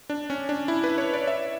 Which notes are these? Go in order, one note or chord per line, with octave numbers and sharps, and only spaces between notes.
D4
C#4
D4
E4
B4
C#5
D5
E5